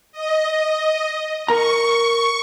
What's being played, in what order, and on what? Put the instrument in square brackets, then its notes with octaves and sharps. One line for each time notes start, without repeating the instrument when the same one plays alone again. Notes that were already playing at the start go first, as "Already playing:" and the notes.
[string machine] D#5
[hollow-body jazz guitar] A#4 A#5 [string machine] C#6